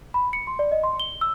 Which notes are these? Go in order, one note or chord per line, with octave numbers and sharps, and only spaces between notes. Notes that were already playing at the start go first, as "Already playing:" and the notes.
B5
C#7
C6
D5
D#5
C6
G7
E6